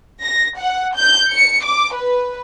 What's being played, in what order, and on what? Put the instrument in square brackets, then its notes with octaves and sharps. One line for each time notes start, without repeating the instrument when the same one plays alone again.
[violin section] A#6
F#5
G6
C#7
D6
B4